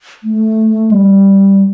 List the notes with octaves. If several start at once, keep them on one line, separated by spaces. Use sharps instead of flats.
A3
G3